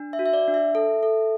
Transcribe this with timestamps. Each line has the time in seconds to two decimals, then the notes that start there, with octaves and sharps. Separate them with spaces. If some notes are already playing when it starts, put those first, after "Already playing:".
Already playing: D4
0.13 E5
0.19 F#4
0.26 E5
0.33 D5
0.48 D4
0.54 E5
0.75 A4
1.03 A4